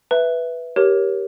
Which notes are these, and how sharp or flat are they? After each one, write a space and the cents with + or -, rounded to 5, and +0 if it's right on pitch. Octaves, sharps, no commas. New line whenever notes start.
B4 +0 E5 +0
G4 -5 A#4 +15 C#5 +0